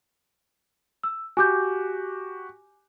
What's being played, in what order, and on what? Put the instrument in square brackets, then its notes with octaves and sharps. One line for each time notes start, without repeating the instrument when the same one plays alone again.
[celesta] E6
[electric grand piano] F#4 G4 [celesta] G#5 D6 G6